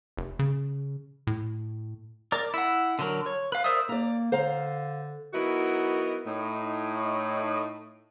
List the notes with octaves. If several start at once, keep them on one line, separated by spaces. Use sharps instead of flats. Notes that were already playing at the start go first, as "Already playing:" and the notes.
F1
C#3
A2
A#4 D5 D6
E4 F#5
D3 F#3 A#4
C#5
B4 F5
A#4 C5 D5 E5 D#6
A#3 D5 A#5
D3 C5 F5 A#5
F#3 B3 D#4 E4 F#4 A#4
A2 D#4